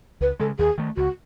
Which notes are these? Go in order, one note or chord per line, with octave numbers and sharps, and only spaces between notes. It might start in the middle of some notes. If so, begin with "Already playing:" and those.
C#2 B4
C#3 G#3 A4
D#2 G#4
D#3 A3
C#2 F#4